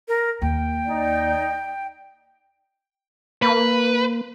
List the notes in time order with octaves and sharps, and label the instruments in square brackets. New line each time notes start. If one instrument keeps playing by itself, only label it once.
[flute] A#4
[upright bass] D#2 [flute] G5
[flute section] D#4 D5
[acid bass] A#3 [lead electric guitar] B4